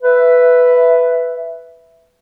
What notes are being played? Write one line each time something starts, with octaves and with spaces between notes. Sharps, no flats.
B4 E5